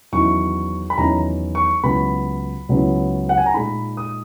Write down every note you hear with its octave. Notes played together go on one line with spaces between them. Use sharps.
E2 D#3 F#3 C#4 E4 C#6
B5
E2 D#3 F#3 C#4 E4 A#5
C#6
C#2 C#3 F#3 B3 E4 B5
C#2 C#3 F#3 B3 E4
F#5
G#5
A#5
A#2 G#3 D#4 B5
D#6